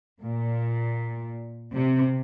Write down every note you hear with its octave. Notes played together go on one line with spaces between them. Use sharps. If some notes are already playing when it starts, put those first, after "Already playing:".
A#2
C3